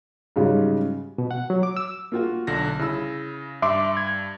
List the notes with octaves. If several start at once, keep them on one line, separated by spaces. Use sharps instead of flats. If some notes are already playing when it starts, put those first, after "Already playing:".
G#2 C#3 F#3 G3
B2
F#5
F#3
D6
E6
A#3 F4 F#4
B1 D3 A#6
C#3 E4 E6
G2 E5 C6 D6
G#6